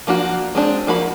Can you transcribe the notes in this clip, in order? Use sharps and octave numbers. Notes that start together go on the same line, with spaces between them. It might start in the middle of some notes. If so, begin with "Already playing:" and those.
F3 A#3 D4 F#4
G#3 C4 D4
F3 A#3 F#4 B5